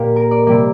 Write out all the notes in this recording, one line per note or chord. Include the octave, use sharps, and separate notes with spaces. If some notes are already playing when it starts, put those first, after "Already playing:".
Already playing: A#2 A#3 G4
A#4
D5
C3 G3 A#3 D5